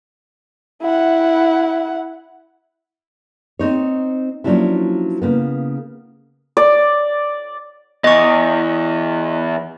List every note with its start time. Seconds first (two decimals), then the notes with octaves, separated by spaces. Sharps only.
0.82 E4 F#5
3.59 C4 D#4 C#5
4.44 F3 F#3 A#3 C#4 D4 E4
5.22 C#3 A#3 B3
6.57 D5
8.04 E2 D#5 C#6